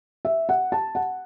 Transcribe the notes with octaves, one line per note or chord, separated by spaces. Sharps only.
E5
F#5
A5
F#5